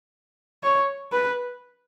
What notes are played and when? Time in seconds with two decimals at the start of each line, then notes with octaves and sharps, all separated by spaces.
0.63 C#5
1.13 B4